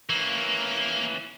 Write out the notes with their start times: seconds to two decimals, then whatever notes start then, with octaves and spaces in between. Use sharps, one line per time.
0.10 E3 A#3 C#4